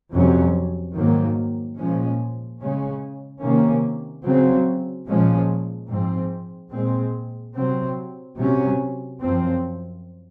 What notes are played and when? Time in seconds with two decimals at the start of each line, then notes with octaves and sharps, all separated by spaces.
0.12 F2 C3 F#3 C#4
0.95 G#2 D#3 F#3 A#3
1.77 A#2 F3 G#3 C#4
2.60 C#3 G#3 C#4
3.42 C3 D#3 A#3 C#4
4.24 C#3 F#3 C4
5.07 A#2 F3 G#3 C#4
5.90 G#2 F3 C4
6.72 A#2 G#3 C4
7.55 C3 F#3 C4
8.37 C3 F#3 C#4
9.20 F#2 F3 C4